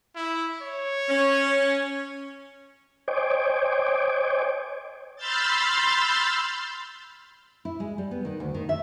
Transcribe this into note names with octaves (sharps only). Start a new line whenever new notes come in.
E4
C#5
C#4
C5 C#5 D#5 G5 G#5 D6
B5 C6 E6 F6 G6 A6
E4
G#3
G3
B3
D#3
D2
D#3
E5